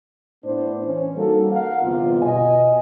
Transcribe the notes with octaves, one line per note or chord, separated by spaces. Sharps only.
A2 B3 D4 E4 C5
E3 C#4 C5
G3 A#3 D#4 F#4 A4
A#4 F5 F#5
G1 E2 C3 B3 F4
B2 D#5 G#5